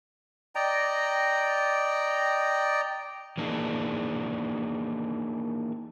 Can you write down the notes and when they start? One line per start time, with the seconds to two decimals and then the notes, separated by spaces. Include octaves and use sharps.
0.55 D5 D#5 G5 A#5
3.37 E3 A#3 D4 D#4 F4 G#4